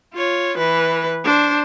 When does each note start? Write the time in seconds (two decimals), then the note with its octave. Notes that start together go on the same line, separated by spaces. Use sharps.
0.14 F4 C#5
0.57 E3 B4
1.24 D4 C5